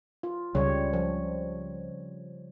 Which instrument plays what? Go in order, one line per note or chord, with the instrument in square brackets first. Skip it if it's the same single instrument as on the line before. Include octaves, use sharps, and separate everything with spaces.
[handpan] F4
[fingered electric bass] C#2 [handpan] C#3 G3 C#5
[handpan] F3